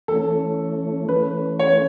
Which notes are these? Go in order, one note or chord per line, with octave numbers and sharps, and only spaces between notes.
E3 A3 C#4 A4
E3 A3 C#4 B4
C#5